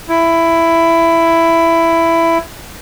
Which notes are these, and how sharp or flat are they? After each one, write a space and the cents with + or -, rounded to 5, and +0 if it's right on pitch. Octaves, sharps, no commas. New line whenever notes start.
E4 +10